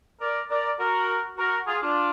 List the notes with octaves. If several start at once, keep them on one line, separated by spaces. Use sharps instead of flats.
A#4 D5
A#4 D5
F#4 A#4
F#4 A#4
F4 G#4
D4 F4